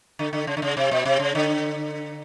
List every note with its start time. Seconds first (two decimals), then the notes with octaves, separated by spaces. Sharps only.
0.19 D3
0.33 D3
0.47 C#3
0.57 D3
0.62 C#3
0.77 C3
0.91 B2
1.05 C3
1.20 C#3
1.35 D3